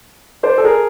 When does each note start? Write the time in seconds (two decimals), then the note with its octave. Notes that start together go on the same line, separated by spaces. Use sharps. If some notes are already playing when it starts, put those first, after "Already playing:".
0.43 C5 D5
0.58 A4
0.64 G#4 A#4